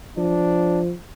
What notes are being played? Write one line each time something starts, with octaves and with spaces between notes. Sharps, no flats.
F3 D4